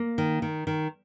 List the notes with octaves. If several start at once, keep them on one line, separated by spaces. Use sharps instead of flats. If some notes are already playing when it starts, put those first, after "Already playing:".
Already playing: A#3
D#3
D#3
D#3